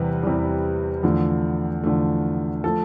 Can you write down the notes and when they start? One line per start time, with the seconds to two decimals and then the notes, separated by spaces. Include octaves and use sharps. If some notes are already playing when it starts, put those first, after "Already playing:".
Already playing: E2 C3 E3 G3 B4
0.23 E2 C3 E3 G3
1.03 E2 D3 F3 A3
1.83 E2 D3 F3 A3
2.64 F3 A3 A4